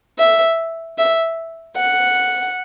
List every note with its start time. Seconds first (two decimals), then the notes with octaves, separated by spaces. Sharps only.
0.19 E5
0.98 E5
1.77 F#5